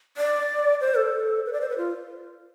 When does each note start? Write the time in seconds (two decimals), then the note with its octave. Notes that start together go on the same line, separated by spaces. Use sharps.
0.17 D5
0.81 C5
0.97 A4
1.46 B4
1.53 D5
1.61 C5
1.69 B4
1.78 F4